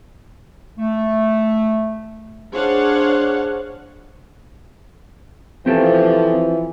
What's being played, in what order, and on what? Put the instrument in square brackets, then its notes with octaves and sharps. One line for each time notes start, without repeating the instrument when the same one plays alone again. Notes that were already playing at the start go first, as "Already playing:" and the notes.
[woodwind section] A3
[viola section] D4 G#4 C5 C#5 F5 F#5
[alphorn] E3 [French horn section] F3 [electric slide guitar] C4 G4 A4